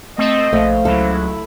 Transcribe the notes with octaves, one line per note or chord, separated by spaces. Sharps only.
A3 C4 D#5
A#1 A3 C5 F5
C#2 F#3 E4 A4